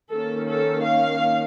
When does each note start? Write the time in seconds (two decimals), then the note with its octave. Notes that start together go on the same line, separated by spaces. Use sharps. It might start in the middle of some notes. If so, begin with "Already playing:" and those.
0.11 D#3 A#3 C#4 A4
0.47 A4
0.84 F5